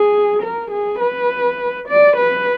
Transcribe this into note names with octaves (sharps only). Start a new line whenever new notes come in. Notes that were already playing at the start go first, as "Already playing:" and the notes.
Already playing: G#4
A#4
G#4
B4
D5
B4